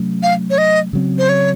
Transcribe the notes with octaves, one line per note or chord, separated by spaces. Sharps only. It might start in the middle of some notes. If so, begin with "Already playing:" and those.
Already playing: C3 F#3 A3 C#4
F5
C#5
D#5
C#3 F#3 C4
C5
C#5